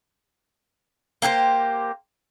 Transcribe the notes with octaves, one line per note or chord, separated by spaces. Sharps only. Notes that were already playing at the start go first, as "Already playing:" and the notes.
A#3 G4 A#4 C5